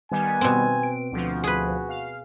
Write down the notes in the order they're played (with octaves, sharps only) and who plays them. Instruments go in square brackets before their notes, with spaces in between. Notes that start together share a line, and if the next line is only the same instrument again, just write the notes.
[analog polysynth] D#3 G3 B3 [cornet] G#5
[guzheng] B2 C4
[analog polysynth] D7
[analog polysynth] D2 F3 [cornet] F#4
[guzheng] G#4 B4
[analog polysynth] F5